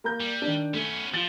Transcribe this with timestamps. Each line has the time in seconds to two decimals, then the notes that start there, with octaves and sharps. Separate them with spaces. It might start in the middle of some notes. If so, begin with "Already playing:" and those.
0.04 A#3 A#5 G6
0.20 G3
0.42 D#3 D4
0.74 A3 B3 C#4
1.14 F3 F4 A6